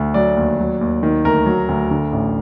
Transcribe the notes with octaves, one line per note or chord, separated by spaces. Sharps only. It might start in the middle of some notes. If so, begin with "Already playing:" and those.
Already playing: D2
F#3 D5
D#2
F#3
D#2
D#3
D2 A#4
F#3
D2
D3
A1